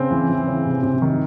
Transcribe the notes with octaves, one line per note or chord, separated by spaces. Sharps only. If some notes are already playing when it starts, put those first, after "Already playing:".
Already playing: C#3 C4
E3
E3
C#3
C3
C3
D#3